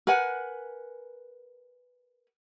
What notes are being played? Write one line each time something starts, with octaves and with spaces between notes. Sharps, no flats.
A#4 B4 F#5 G#5